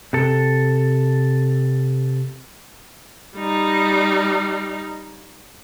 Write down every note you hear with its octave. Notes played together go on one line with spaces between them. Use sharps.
C3 A4
G3 D#4